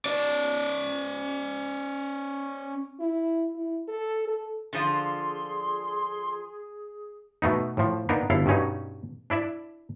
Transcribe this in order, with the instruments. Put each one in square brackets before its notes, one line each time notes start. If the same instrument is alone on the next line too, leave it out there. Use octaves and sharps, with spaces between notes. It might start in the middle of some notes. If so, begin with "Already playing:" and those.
[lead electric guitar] C#4 D5
[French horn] E4
E4
A4
A4
[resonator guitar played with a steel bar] D3 F3 F4 [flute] G#4 [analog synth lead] C6
[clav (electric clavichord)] B2 A3 B3 D#4
A2 F3
A#3 B3 D4 D#4 A#4
G1 F#2 E4 A4 F5
G2 B2 C#4 D#4
D4 E4 D5 E5